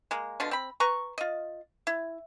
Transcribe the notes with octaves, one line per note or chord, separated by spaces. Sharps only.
G#3 A#3
B2 D3 F4
C4 B5
B4 A#5 C#6
F4 D#5
E4